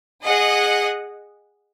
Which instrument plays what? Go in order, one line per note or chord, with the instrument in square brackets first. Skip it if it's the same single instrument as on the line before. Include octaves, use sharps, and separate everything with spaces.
[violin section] G#4 D#5 F#5